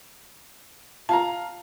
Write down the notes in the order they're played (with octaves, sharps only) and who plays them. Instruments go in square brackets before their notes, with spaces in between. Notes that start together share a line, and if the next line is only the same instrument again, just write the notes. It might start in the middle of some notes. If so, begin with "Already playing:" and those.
[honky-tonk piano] F4 F5 A#5 [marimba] A5